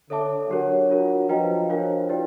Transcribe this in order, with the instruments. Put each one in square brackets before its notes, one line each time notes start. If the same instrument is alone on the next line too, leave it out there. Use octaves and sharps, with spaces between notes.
[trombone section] D3 [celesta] A4 C#5 E5 A5 D6
[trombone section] F#3 [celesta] D4 G4 A#4 C#5
[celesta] D4 F4 A#4
[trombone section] F3 [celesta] F#4 B4 D#5 G5 A#5
[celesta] D4 F#4 A#4 C#5 F5
E4 G4 B4 D5 G5